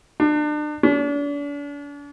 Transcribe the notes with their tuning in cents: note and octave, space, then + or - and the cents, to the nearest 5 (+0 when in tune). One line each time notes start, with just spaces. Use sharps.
D4 +35
D4 -40